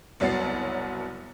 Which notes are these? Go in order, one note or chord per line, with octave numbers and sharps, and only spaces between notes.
F#1 C2 F#3 B3 A6 C7